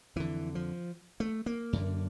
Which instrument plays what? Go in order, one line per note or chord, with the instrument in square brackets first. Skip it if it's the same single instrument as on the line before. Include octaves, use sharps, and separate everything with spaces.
[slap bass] F2 D3 E3
F3
A3
A#3
F#2 D3